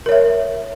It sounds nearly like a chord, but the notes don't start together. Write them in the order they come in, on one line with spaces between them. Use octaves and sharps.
A#4 C#5 E5